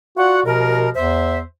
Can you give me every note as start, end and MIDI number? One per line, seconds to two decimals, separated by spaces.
0.17 0.40 65
0.17 0.44 66
0.17 0.40 74
0.17 0.40 78
0.45 0.89 36
0.45 0.89 47
0.45 0.89 53
0.45 0.89 70
0.95 1.42 40
0.95 1.38 72
0.95 1.38 76